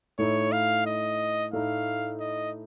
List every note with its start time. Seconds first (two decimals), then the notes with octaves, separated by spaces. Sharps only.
0.18 A2 A3 D#4 C#5
0.52 F5
0.86 D#5
1.53 A2 A3 D#4 F5
2.20 D#5